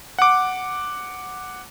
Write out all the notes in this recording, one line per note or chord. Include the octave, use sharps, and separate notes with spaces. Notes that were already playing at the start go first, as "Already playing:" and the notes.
F#5 D6